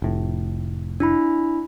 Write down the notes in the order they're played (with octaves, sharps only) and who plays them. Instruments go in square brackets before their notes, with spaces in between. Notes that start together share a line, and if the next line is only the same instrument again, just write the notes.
[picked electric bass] F1 A2
[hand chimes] D4 E4 B5